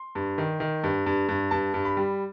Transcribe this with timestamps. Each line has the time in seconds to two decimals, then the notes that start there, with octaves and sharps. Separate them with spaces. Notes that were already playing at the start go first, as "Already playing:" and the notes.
Already playing: C6
0.15 G2
0.38 D#3
0.60 D#3
0.84 G2
1.06 G2
1.29 G2
1.51 G2 A5
1.74 G2
1.85 B5
1.97 G3